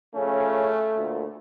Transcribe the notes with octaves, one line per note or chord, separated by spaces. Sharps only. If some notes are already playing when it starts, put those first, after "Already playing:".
C#3 F3 A3 C#4
D2 A#2